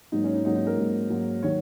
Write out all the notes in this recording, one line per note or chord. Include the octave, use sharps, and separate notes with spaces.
G#2 F#3 A#3 D#4
C#4
D#4
G#2 F#3 A#3 D#4
D#4
A#4
G#2 F#3 A#3
G#2 F#3 A#3
D#3 F#3 C#5